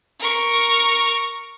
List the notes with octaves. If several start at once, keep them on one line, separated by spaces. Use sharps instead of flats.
A#4 C#6